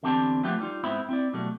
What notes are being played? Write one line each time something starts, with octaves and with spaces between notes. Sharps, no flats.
E2 D3 C4 G4 A5
F3 A3 B3 C4 F4 G4
G3 D#4 F4
G#2 B3 C4 E4 B5
C4 E4 D5
B2 F#3 G3 A3